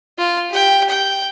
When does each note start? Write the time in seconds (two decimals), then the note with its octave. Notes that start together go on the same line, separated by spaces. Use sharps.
0.18 F4
0.50 G4 G5
0.89 G5